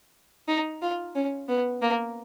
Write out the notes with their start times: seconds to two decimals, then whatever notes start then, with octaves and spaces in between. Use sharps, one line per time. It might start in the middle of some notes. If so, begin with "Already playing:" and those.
0.48 D#4
0.82 F4
1.15 C#4
1.48 B3
1.82 A#3